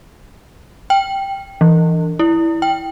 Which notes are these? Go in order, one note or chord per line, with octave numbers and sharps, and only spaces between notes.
G5
E3
E4
G5